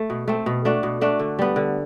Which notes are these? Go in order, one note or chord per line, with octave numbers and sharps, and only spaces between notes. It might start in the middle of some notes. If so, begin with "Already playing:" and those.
Already playing: A3
B2
A3 C4
B2
A3 D4 F#4
B2
A3 D4 F#4
D3
G3 B3
D3